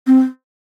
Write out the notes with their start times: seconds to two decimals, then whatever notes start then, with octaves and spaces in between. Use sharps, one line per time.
0.07 C4